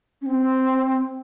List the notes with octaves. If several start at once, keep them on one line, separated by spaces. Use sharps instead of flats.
C#4
C4